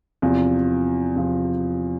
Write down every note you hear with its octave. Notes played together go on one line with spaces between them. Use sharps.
E2 C3 F3
E2 C3 F3